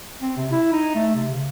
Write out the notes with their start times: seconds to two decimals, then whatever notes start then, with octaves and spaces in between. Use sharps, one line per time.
0.22 C4
0.37 C3
0.51 E4
0.73 D#4
0.95 A3
1.15 C3
1.31 C#3